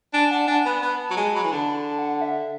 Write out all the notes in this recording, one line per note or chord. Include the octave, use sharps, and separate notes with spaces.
D4 G#5
D4 F#5
D4 G#5
B3 G#5
B3 B5
A5
F#3
G#3 A5
A5
F#3 B5
E3
D3 A5
B5
A5
F#5
E5